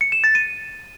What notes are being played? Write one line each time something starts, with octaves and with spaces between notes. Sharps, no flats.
C#7
E7
A6
D#7